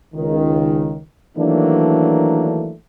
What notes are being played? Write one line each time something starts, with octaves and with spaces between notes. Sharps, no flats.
C#2 D#3
D#3 E3 F#3 A3 A#3 D4